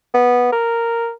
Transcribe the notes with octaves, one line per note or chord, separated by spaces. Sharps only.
B3
A#4